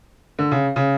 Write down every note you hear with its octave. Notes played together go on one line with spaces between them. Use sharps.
D3
C#3
C#3